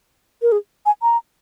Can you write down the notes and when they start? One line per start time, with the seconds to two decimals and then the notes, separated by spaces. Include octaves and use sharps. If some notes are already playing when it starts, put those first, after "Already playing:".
0.42 A#4
0.52 G#4
0.86 G#5
1.02 A#5